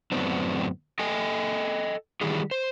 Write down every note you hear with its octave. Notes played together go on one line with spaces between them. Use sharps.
F#2 A2 D3 B3 C4 D4
A4 D#5 G5 G#5
D#3 E3 G3 G#4
C5